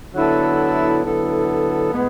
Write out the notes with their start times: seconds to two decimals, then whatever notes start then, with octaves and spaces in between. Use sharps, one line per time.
0.14 D3 F#3 B3 E4 A4
1.03 D3 F#3 B3 E4 A4
1.93 A2 G#3 B3